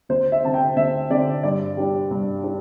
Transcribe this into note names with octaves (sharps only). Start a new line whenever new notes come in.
D2 C5
E5
D3 C4 A5
G5
D2 E5
D3 C4 D5
G2 D5
G3 D4
G2
G3 D4